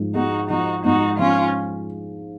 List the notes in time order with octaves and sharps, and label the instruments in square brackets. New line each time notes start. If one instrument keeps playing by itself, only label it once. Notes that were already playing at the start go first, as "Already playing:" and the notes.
Already playing: [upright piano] G#2 F3
[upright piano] G#3 [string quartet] D#4 F#4
[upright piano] F3 [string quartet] D#4 F#4
[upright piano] G#2 [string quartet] D#4 F#4
[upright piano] F3 [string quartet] C#4 F4